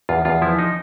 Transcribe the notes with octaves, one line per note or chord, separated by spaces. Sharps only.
E2 F4
E2 F4
F3 E4
D#4